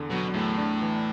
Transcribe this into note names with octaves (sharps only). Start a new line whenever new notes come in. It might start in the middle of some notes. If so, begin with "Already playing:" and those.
Already playing: E2 D3
B2 F#3
E2 A2
D4
E3